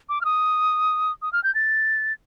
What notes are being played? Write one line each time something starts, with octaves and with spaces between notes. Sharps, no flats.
D6
F6
D#6
D#6
F6
G6
A6